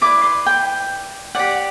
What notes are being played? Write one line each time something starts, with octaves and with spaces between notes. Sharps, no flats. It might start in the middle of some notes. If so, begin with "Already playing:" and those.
E4 B4 D5 D6
C6
G5
G4 D5 F#5